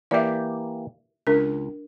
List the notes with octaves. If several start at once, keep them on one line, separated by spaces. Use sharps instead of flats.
E3 A#3 G4 D5 E5
C#2 D4 A#4